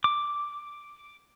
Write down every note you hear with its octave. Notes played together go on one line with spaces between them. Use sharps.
D6